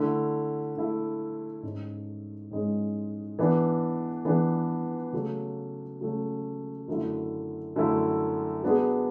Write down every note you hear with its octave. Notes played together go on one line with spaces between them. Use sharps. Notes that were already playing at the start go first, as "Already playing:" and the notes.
Already playing: D3 A3 E4
D3 A3 E4
G#2 G#3 C#4
G#2 G#3 C#4
E3 B3 D4
E3 B3 D4
C#3 F#3 A3 C#4
C#3 F#3 A3 C#4
F#2 D3 A3 E4
F#2 D3 A3 E4
F#3 B3 D4 G#4